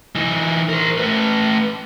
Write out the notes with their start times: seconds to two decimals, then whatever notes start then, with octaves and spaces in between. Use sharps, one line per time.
0.15 E3 D#4
0.69 A#4 C5
0.98 A3 B4